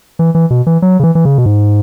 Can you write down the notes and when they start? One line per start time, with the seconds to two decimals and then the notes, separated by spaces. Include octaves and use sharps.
0.19 E3
0.35 E3
0.50 B2
0.67 E3
0.82 F#3
1.00 C#3
1.03 E3
1.15 E3
1.25 C#3
1.38 B2
1.46 G#2